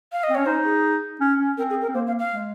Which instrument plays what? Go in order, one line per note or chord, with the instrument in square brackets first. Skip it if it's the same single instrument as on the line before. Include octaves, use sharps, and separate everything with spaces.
[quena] F5
D#5
[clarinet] C4
[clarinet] C#4 [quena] C#5
[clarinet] D#4 [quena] C5
[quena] G#4
[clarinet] C#4
C#4
[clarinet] C4 [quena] A#4
[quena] G#4
A#4
[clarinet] C4
[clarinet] A#3 [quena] C5
[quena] F5
F5
[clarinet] G#3